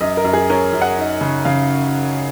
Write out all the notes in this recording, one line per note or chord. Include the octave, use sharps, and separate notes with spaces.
F#2 D#5
A#4
F#2
G#4
C#4 A#4
F#2
F#5
D#4
C#3
C#3 F5